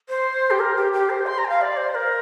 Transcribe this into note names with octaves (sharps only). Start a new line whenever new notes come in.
C5
G4
A#4
G4
G4
C5
C6
A#5
G5
F5
D5
C5
A#4